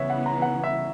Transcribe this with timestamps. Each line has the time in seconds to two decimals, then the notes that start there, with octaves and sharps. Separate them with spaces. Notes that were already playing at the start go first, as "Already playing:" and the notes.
Already playing: C#3 E3 B3 C#5 E5
0.10 F#5
0.26 A#5
0.42 F#5
0.64 E5